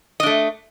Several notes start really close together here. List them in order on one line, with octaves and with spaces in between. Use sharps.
D#5 D4 A3